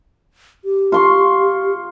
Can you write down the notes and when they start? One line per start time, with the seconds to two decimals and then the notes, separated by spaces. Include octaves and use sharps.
0.65 G4
0.92 F4 C6 C#6